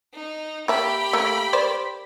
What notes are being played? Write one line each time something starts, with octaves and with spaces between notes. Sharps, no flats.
D#4
A#3 G4 E5 A5 B5
A3 A#3 A4
A#4 C5 D5